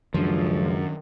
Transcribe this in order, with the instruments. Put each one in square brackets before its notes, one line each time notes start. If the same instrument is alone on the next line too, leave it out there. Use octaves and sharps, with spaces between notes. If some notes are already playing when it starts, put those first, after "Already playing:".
[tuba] C#2 [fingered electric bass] F#2 [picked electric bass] D#3 D4 [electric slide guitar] F3